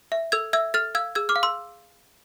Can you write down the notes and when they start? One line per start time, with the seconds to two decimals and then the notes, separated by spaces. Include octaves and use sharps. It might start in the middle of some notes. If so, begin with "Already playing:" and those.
0.12 E5
0.32 A4 E6 G#6
0.53 E5 E6 G#6
0.74 A4 F6 A6
0.95 F5 E6 G#6
1.15 G#4 E6 G#6
1.29 D6 F6
1.36 F5
1.43 C6 E6